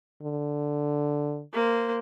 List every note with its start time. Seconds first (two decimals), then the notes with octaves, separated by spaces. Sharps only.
0.22 D3
1.53 A#3 C5